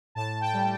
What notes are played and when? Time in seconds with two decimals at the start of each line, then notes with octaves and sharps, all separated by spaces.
0.15 A2 A5
0.41 G5
0.53 G3